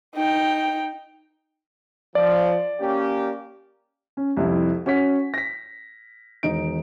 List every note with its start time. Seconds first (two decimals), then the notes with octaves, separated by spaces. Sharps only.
0.16 D#4 G5
2.15 F3 D5
2.80 A#3 C#4 G4
4.17 C#4
4.37 C2 F2 E4
4.86 C#4 F#4 C#5 C#6 B6
5.34 A#6 B6
6.43 E1 D#3 D#4 D7